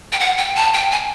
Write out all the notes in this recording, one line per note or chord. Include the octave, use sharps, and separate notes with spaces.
G5
F#5
G5
A5
G5
G#5